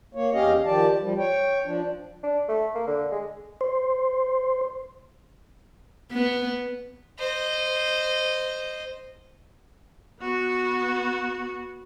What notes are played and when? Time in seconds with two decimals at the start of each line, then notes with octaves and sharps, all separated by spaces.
0.15 A#3 C#5
0.33 E2 C#4 G4 D#5 F5
0.66 D#3 F3 G4 D5 A5
1.00 F3 G3
1.18 C#5 G5
1.65 F3 D4
2.23 D4
2.48 A3
2.75 A#3
2.87 D3
3.12 G#3
3.61 C5
6.11 B3
7.18 C5 D#5
10.20 B3 F#4